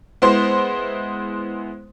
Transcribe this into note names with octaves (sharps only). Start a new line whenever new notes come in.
G#3 B3 E4 C5 C6